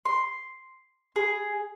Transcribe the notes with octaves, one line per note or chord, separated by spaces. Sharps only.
C6
G#4